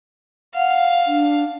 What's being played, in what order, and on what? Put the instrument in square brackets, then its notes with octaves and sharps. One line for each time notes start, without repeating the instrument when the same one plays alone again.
[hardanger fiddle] F5 [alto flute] F#5
[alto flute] D4